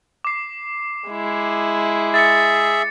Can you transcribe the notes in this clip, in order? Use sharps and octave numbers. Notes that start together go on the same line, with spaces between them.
D6 C7
G#3 E4
G#4 E5 A6 C#7